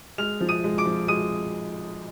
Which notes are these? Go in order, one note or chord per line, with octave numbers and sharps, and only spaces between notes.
G#3 F6 F7
F3
D#6 D#7
G#3
D6 D7
F3
G#3 D#6 D#7